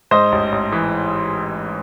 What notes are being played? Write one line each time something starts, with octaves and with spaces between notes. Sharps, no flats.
G#2 C5 D#5
A1
A1
E3